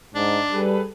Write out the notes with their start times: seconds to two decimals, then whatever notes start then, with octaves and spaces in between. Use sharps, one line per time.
0.15 G#2 D4
0.52 G3 G#4 A4 B4